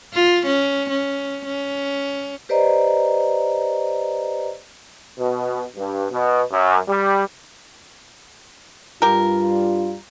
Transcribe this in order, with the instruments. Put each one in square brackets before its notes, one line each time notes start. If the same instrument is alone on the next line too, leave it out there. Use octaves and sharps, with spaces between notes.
[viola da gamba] F4
C#4
C#4
C#4
[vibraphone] G4 B4 C5 D5 D#5 A#5
[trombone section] B2
G2
B2
F#2
G3
[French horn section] G2 G3 F4 [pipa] G4 A#4